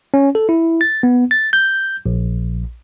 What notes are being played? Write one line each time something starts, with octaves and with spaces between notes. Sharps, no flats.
C#4
A4
E4
A6
B3
A6
G6
A#1